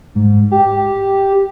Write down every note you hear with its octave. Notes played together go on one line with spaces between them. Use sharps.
G#2
G4